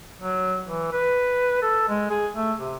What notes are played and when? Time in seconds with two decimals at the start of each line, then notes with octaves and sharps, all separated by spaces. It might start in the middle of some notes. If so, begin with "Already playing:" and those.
0.20 F#3
0.66 E3
0.92 B4
1.62 A4
1.89 G#3
2.11 G#4
2.35 A3
2.58 C3